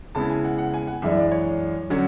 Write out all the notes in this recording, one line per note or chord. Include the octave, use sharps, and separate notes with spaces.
C#3 G#3 B3 E4 A5
G#5
F#5
F#5
G#5
F#5
F#2 E3 G#3 D4 E5
D5
C#5
D3 F#3 C#4